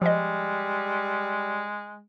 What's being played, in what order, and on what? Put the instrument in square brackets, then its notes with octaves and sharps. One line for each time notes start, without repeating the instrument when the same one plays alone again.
[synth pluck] F3 D#5 [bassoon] G3 [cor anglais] G#3